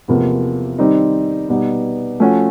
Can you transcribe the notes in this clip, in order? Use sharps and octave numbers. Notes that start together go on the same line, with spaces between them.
E2 C3 F3 A#3
D#3 G3 C4 D#4
B2 G3 B3 D#4
F3 A3 C#4 F#4